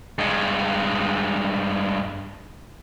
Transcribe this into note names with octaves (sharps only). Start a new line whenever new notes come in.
G2 G#3